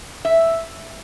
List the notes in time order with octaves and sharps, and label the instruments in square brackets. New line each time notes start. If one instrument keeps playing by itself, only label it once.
[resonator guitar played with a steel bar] E5